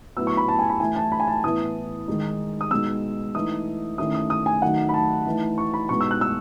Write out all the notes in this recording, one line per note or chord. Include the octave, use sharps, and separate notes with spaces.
A2 F#3 B3 E4 E6
C#6
B5
A5
G#5
B5
E3 A3 E4 G#5
A5
B5
G#5
A5
A2 E3 B3 E4 D#6
D#3 G#3 D#4
D#6
B2 G#3 D#4 E6
E3 A3 D#4 D#6
D#3 A3 C#4 E4 D#6
D#6
D#6
G#5
D#3 F#3 A3 D#4 F#5
B5
A5
E3 A3 D#4
C#6
B5
B2 G#3 B3 D#4 C#6
E6
F#6
E6